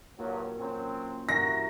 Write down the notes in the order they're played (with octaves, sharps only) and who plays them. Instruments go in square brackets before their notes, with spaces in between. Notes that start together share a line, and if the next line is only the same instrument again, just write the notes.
[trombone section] G2 F#3 [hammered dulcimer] A#2
[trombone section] F#3 C4 [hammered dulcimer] C#4 C5
[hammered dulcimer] G2 E3 [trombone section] F#4 A#4 [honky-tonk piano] A#6